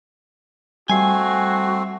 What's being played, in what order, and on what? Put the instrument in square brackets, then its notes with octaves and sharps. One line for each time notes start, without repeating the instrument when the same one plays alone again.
[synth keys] G3 C7 [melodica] A3 C4 [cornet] F#4 [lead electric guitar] G#5